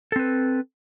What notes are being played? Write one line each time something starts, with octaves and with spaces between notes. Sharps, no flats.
C4 A4 B4